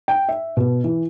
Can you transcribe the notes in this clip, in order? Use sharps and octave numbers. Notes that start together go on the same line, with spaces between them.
G5
E5
B2
E3